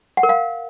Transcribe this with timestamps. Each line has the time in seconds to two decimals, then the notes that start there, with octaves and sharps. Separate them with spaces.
0.17 F#5
0.23 A#4
0.29 F5